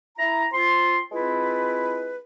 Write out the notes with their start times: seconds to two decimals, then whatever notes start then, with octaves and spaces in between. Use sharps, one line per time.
0.18 E4 A#5
0.53 C4 F4 C6
1.12 G#3 C4 E4 F4 B4